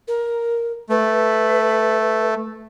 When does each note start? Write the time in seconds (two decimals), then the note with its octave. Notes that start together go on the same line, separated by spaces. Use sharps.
0.07 A#4
0.90 A3 B4